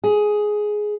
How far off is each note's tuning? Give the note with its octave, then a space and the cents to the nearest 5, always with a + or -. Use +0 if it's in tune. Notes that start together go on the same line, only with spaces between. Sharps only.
G#4 +10